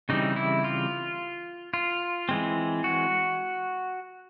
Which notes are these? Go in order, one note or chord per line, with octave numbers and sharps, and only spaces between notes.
C#3 E3 G3 C4 D#4
E4
F4
F4
E3 G#3 C4
F#4